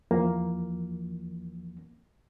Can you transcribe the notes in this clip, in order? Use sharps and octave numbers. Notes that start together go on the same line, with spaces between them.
E2 E3 F3 A#3